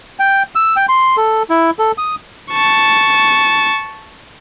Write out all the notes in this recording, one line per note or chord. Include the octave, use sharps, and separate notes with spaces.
G5
E6
G5
C6
A4
E4
A4
D#6
A5 C#6